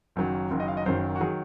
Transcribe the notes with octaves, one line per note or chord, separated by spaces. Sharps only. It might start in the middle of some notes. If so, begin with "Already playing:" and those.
F#1 F#2 D#3 F#3
F#1 F#2 D#3 F#3
D#5
F5
D#5
F#1 F#2 D#3 F#3 C5
F#4
D#3 F#3 G#4